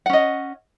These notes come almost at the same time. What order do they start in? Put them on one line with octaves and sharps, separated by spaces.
F#5 C#4 D#5